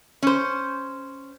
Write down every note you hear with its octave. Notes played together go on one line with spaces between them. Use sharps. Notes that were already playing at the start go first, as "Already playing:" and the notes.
C#4 C5